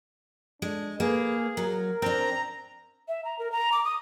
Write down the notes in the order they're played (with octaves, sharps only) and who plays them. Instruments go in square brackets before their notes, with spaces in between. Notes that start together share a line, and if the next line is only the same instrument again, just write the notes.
[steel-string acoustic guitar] G#3 [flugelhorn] D4
[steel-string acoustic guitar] A#3 [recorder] G#4 [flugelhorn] B4
[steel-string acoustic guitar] F#3 [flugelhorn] A#4
[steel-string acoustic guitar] C4 D4 [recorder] A#5
[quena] E5
A#5
A#4
A#5
D6
D#6